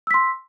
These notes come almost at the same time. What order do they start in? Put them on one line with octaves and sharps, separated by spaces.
E6 B6 C6